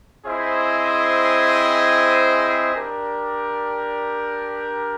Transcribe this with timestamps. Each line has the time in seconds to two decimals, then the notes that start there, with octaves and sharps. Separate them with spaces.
0.24 C4 E4 G#4 C5 D#5
2.73 D4 G4 A#4 D5